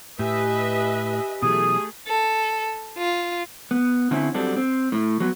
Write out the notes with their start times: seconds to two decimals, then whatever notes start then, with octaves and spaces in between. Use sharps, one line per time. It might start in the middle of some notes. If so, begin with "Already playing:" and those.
0.19 A2 G4 B4 D#5 E5 G#5
1.42 B2 E3 F#3 A3 G#4 D#6
2.07 A4
2.97 F4
3.71 B3
4.11 D3 C4 C#4 E4
4.34 F#3 G3 C4 D4 A4
4.56 C4
4.92 A2
5.20 F#3 B3